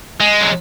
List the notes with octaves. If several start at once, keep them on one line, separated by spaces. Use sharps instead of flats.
G#3
F#3